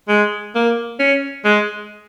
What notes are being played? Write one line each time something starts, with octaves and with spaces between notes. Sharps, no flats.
G#3
A#3
C#4
G#3